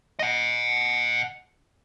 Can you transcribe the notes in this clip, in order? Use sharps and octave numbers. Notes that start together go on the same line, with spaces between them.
D#5 F#5